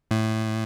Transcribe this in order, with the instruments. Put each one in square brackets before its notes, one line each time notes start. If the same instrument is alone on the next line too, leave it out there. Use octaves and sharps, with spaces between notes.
[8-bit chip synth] A2